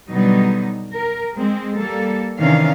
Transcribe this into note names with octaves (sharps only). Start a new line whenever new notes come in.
B2 D3 F#3 G3 B3 D#4
A#4
G#3 C4
G3 A#3 A4
C3 D#3 E3 C#4 D4 F5